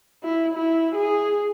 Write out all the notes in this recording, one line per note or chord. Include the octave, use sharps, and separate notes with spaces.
E4
E4
G#4